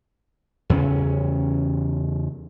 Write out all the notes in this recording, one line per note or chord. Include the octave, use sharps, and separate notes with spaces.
E2 C#3 B3 C#4